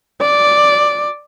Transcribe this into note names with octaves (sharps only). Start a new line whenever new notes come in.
D5